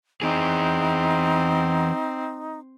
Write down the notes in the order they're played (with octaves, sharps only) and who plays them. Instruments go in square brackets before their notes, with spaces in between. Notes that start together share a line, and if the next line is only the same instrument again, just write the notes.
[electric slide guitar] E3 G#4 [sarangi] C4 [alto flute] D#4